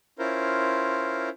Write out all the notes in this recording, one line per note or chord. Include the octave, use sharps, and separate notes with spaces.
C#4 E4 F4 A#4 C5